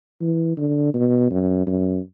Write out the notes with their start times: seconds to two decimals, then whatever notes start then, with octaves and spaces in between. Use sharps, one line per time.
0.21 E3
0.57 D3
0.94 B2
1.30 F#2
1.67 F#2